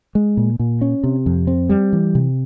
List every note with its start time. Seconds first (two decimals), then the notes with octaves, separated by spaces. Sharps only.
0.15 G#3
0.37 A#2
0.59 A#2
0.81 C#4
1.04 C3
1.26 F2
1.47 C4
1.69 G3
1.93 E3
2.15 C3